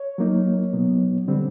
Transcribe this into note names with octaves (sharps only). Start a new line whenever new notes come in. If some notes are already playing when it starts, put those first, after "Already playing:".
Already playing: C#5
F#3 A#3 D#4
B2 F#3 B3
D3 G3 C4